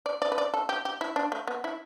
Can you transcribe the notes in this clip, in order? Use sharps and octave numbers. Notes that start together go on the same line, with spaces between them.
D5
D5
B4
D5
A4
G4
G4
E4
D4
A3
B3
E4